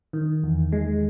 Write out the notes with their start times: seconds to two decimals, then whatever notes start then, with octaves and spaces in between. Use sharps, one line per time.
0.13 D#3
0.43 E2
0.72 G#3